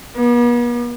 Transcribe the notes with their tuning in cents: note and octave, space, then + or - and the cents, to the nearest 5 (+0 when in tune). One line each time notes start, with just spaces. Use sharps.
B3 -45